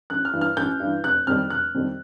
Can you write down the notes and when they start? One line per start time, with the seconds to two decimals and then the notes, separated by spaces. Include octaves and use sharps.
0.10 A1 F#6
0.25 F6
0.34 G2 E3
0.41 F6
0.57 A1 G6
0.80 G2 E3
1.04 F1 F#6
1.27 F2 C3 D#3 G3 F6
1.50 F1 F#6
1.74 F2 C3 D#3 G3